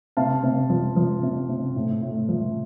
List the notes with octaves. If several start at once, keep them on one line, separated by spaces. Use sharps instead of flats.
C3 F5 A5
C3
F3
F3
C3
C3
A2
A2
F3